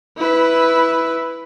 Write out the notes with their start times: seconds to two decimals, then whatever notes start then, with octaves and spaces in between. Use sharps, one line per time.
0.17 E4 B4